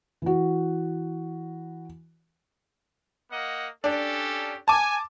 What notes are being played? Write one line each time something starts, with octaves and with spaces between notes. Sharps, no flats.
E3 F#4
A#3 D#5 F#5
C#4 D4 G4 A4
G#5 A5 D6